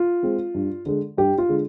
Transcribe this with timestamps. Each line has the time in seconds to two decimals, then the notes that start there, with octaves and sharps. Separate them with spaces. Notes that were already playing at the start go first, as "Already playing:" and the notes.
Already playing: F4
0.23 G#3 C4
0.54 G2
0.86 D3 G#3
1.17 G2 G4
1.38 F4
1.49 D3 G#3